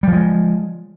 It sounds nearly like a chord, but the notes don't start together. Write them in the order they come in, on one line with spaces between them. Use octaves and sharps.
G3 F3 G#3